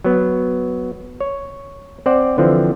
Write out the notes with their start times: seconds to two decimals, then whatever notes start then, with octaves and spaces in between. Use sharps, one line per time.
0.04 F#3 B3
1.21 C#5
2.06 C4 C5 D5 F#5
2.38 D3 E3 F3 C4